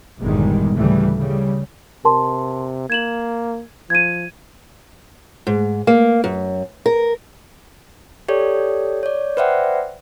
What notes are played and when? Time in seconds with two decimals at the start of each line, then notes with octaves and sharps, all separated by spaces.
0.20 G1 E2 A#2 D#3 G3 G#3
0.76 D2 A2 C#3 E3 G3 A3
1.19 C#3 G3
2.05 C3 A#4 A5 C6
2.90 A#3 G#6 E7 F#7
3.90 F3 G#6 D#7
5.47 G#2
5.87 A#3
6.24 F#2
6.86 A#4
8.28 G4 A4 C#5 D5
9.03 C#5 D5
9.37 B4 C5 D5 E5 F#5 G5